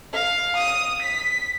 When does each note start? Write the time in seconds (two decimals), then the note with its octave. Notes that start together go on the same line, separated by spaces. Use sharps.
0.13 F5
0.57 D#6
1.02 B6